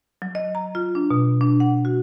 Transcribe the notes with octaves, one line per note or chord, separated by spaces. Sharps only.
F#3
D#5
A#5
F4
D4
B2
D4
F#5
F#4